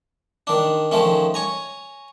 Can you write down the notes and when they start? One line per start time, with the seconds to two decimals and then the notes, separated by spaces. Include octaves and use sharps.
0.47 D#3 D4
0.91 D#3 F3 A3 C#4
1.34 C#5 G#5 A#5